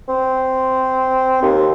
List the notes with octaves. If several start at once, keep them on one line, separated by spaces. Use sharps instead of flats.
C4
D#2